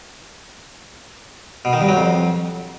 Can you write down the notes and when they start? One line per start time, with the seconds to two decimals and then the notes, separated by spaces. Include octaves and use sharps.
1.65 B2
1.73 D#3
1.81 G2
1.89 F#3
1.97 F2